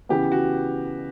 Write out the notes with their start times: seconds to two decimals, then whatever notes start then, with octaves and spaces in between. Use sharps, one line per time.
0.09 C#3 E3 B3 G4
0.32 F#4